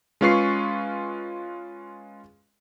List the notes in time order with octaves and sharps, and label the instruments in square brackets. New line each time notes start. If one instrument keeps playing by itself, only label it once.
[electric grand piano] G#3 C#4 F4 B4 C#6 C7